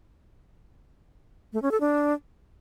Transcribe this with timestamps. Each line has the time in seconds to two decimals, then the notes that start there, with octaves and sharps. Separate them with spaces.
1.53 A3
1.62 C#4
1.71 A4
1.81 D4